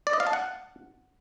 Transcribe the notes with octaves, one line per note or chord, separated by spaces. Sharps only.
D5
D#5
F5
A5
F#5